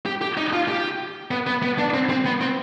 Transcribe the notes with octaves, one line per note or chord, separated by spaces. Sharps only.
G4
G4
D#4
F4
G4
B3
B3
B3
D4
C4
C4
B3
C4